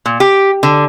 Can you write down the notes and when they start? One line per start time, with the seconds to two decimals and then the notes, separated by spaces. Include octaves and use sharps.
0.06 A#2
0.20 G4
0.63 D3